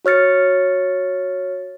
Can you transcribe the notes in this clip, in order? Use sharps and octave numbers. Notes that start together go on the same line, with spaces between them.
F#4 C#5 F6 A6 C#7